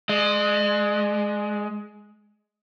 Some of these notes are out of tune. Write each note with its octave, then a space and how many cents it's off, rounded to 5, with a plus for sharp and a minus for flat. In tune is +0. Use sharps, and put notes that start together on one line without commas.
G#3 +15 D#5 -45